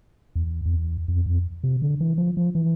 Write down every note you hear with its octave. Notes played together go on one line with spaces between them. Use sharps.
E2
F2
E2
F2
F2
C3
D3
E3
F3
F3
E3